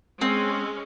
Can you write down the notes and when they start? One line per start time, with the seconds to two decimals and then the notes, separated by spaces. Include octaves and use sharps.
0.21 G#3 C4 C#4